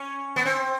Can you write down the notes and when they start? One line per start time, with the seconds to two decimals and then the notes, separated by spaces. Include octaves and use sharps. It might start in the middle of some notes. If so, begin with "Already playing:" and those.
Already playing: C#4
0.36 B3
0.46 C4